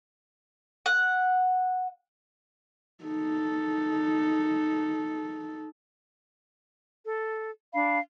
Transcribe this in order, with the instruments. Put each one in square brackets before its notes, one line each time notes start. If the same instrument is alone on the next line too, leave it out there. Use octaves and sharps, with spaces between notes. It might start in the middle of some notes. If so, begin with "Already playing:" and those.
[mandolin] F#5
[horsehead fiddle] D#4 A4
[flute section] A4
D4 F5 B5